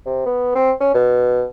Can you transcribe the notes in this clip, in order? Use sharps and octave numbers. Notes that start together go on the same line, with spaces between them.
C3
B3
C4
C#4
B2